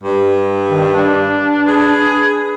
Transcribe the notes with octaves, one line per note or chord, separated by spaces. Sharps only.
G2
D#3
D4
G#4 B4